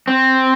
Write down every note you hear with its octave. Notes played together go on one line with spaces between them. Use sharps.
C4